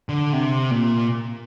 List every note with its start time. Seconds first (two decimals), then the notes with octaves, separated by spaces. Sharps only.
0.09 D3
0.33 C3
0.71 A#2